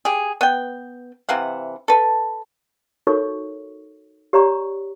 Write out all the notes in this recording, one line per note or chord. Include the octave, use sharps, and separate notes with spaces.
G4 G#4
B3 G5
C3 E3 F5 F#5
A4 B4
D#4 F#4 A4 A#4 C#5 C#6
G4 C#5 D5 A#5 C#6